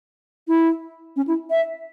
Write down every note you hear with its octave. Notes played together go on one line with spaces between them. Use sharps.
E4
C#4
E4
E5